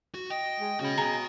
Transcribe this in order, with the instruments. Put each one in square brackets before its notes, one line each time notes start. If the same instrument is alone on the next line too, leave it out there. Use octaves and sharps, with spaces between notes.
[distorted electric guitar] F#4
[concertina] D#5 [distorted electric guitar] G5
[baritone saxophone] G#3
[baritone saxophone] C#3 [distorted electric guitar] F#4 B5
[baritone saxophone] G#4 [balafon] A#5